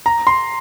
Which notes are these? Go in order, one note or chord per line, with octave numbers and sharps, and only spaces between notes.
A#5
C6